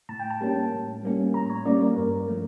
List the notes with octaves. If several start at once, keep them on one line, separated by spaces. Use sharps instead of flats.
A2 A5
G5
A5
G3 A#3 C#4
A2
G3 A#3 C#4
A2 A#5
C#5
G3 A#3 C#4 D5
A#4
G2 A#4
F3 A3